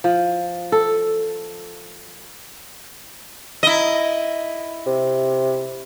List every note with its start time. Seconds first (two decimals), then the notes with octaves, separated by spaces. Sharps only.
0.04 F3
0.72 A4
3.63 E4 D#5
4.87 C3